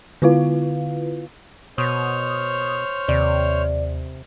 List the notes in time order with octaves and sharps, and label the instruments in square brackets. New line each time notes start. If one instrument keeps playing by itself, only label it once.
[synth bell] D3 B3 E4 F4 B4 F5
[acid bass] B2 [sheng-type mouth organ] C5 C#5 F6 [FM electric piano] D#6
[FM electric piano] D#2 [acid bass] C3 [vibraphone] D5